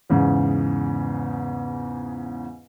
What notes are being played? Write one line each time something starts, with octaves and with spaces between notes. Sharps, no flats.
E2 G#2 C#3